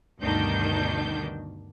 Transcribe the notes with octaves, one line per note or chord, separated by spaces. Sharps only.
D2 G2 B2 D#3 D4 G6